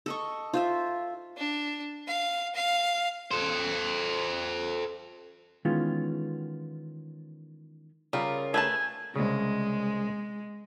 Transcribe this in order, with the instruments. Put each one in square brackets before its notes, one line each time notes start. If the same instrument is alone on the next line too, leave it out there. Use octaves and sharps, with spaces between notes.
[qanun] A4 D#5 C#6
F4 C5 E5
[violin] D4
F5
F5
[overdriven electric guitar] A4 C5
[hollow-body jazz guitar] D#3 E3 G#3 B3 C#4 F4
[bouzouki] C#3 F4 A#4 [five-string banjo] G3
[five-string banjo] A3 B4 A5 [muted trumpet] G#5
[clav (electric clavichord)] C2 C#3 [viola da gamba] G#3